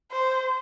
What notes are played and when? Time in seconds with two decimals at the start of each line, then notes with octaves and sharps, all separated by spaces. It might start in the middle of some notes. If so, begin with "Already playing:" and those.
0.12 C5